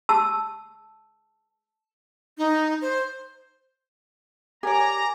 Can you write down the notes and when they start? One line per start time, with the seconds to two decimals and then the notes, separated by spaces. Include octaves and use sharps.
0.09 A5 E6
2.38 D#4
2.82 C5
4.63 G4 A#4 C#5 D5 G#5 A#5